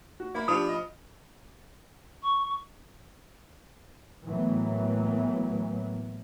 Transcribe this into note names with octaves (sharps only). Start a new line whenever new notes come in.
F#4
A#3 E4 B5
F3 D4 G4 D#6
D#5
C#6
A2 E3 F#3 A#3 B3